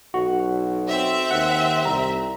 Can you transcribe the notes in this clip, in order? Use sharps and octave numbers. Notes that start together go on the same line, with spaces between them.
B1 F#4
C4 E5
D#2 F#5
C2 A#5